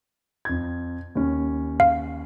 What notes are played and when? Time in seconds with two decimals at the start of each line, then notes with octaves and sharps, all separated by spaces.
0.45 F2 G#6
1.15 D#2 C#4
1.80 F5